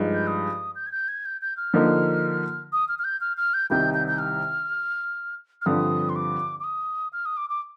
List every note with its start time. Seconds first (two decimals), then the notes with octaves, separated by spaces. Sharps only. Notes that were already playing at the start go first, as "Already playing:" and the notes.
Already playing: G2 F3 G#3 D#4
0.14 G6
0.27 D#6
0.75 G6
0.87 G#6
0.92 G6
1.08 G#6
1.25 G6
1.41 G6
1.57 F6
1.74 D3 F3 A#3 D#4
2.73 D#6
2.88 F6
2.99 F6
3.04 G6
3.21 F6
3.37 F6
3.54 G6
3.70 C2 C3 D#3 G3 G6
3.94 G6
4.08 G6
4.19 F6
5.62 F6
5.66 G2 D3 F3 C4 D#6
6.09 C6
6.16 D6
6.60 D6
6.64 D#6
7.13 F6
7.25 D#6
7.37 D6
7.50 D6